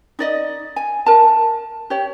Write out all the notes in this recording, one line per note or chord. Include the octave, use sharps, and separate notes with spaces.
D#4 D5 D#5
G#5
A#4 A5
G4 C#5